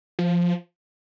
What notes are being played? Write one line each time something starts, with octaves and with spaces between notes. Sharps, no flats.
F3